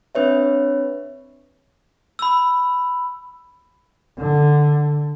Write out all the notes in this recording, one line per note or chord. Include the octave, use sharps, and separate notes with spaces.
C4 D4 B4 C#5 E5
B5 E6
D3